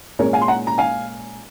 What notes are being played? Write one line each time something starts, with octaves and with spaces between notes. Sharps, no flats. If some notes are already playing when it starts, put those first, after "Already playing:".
A#2 G#3 C#4 A#4 C#5
F5 G#5
C6
F#5 A#5
A#5
F5 G#5